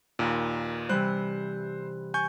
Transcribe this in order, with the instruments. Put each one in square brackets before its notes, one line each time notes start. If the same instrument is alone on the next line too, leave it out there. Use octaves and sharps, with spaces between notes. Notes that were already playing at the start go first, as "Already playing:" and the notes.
[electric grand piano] D#2 A#2 [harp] D#4 B4
[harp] C3 E3 G3 [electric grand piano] C5 F#6
[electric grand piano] G#5 C#6 G6